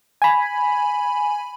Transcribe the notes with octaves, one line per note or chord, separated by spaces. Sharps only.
G#5 B5